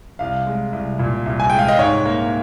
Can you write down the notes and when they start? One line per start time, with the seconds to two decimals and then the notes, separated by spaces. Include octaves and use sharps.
0.19 C2 F5
0.47 G#3
0.73 C2
0.99 A#2
1.26 C2
1.40 G#5
1.50 G#3 G5
1.59 F5
1.68 D#5
1.78 G#2 C#5
2.05 A#3